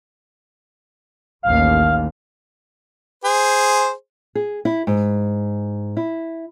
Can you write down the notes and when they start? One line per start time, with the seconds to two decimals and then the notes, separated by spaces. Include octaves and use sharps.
1.43 A1 D#2 F5
3.24 G#4 C5
4.35 G#4
4.65 E4
4.87 G#2
5.97 E4